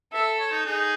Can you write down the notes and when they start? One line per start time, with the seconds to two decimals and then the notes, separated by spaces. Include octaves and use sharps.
0.12 A4 E5
0.40 C#5
0.52 D#4
0.66 D#4 G#4